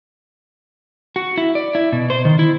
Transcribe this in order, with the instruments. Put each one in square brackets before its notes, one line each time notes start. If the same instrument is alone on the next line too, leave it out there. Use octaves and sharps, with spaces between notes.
[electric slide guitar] F#4
E4
D5
E4
B2
C5
D#3
E4